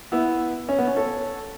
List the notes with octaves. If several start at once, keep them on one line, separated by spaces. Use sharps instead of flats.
B3 E4
C#4
B3
C#4
A4 C#5